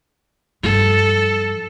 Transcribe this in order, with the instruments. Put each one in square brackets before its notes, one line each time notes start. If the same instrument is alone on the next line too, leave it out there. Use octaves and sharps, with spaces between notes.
[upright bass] G2 F3 [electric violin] A4